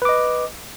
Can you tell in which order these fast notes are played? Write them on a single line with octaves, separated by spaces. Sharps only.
B4 D6 D#5